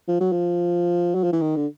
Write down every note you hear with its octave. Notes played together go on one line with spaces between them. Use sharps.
F3
F#3
F3
F#3
F3
E3
D#3
D3